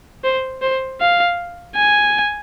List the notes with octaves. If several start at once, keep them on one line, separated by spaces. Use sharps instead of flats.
C5
C5
F5
G#5